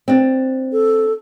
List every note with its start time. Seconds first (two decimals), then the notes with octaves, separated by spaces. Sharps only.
0.08 C4 D4
0.72 A4